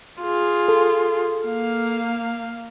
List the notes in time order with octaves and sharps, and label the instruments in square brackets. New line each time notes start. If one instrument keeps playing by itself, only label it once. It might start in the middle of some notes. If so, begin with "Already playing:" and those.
[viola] F4 G#4
[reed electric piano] A4
[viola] A#3 F5